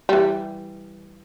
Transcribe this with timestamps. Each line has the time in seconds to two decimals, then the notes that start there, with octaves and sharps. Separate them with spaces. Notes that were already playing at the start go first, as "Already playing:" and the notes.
0.09 E3 G3